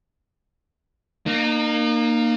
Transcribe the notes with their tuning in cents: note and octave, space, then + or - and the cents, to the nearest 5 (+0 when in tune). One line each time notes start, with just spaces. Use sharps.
A#3 +0 D#4 -40